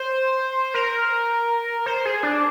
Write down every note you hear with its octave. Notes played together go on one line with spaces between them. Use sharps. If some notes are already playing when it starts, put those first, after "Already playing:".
Already playing: C5
A#4
C5
G#4
D4